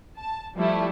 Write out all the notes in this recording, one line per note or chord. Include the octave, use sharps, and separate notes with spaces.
A5
F3 G3 A3 E4